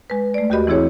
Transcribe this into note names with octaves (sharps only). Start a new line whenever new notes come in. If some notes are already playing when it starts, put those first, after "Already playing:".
G#3 B4
A3 D5
D#2 F#4 G4 A#4 D#5 B5
E3 C4 E4 G#4 C#5